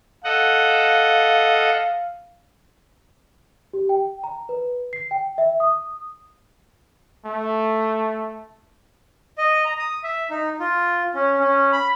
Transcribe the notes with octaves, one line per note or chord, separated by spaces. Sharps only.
A4 D#5 F5 F#5
G4
G5
A#5
B4
C7
G5
E5
D#6
A3
D#5
A#5
D#6
E5
D#4
F4
C#4
C#4
B5